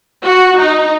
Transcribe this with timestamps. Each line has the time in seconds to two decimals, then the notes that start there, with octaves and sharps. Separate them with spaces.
0.24 F#4
0.58 D#4